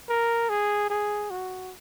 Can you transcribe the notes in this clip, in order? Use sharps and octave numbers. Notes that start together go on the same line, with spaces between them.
A#4
G#4
G#4
F#4